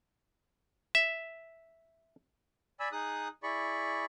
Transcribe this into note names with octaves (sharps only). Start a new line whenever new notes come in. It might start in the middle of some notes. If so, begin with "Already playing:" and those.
E5
D5 G#5 B5 E6
D#4 G#4 D#6 F#6
E4 G#4 D5 B5 C#6